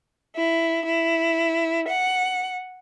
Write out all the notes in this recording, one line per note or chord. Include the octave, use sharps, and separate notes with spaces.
E4
E4
F#5